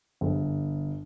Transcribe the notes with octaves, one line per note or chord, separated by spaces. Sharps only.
G1